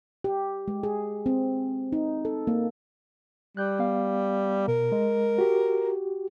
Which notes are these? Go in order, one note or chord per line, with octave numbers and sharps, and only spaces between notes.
G4
G#3
G#4
C4
D#4
A4
A#3
G3 F#6 G6
B3 F5
B2 A#4
G#3 D#5
F#4 G4